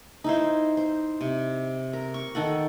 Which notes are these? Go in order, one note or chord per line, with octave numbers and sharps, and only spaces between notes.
D#4 E4 C5
C5
C3
A#4
C#6
D#3 A4 F#5